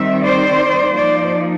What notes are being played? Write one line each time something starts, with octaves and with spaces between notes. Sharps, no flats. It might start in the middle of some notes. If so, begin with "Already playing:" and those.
Already playing: D#3 G3 C4 D#4 E5
C5 D5
F3 A#3 D#4 C5 D5